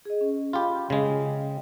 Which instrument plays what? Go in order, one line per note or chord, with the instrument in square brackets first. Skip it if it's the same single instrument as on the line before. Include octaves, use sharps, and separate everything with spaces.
[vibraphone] G#4 D#5
C#4
[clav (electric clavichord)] F4 G4 [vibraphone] B5
[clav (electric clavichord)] C#3 G#3 [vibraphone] G5